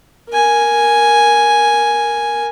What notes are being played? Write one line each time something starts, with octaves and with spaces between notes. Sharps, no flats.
A#4 G#5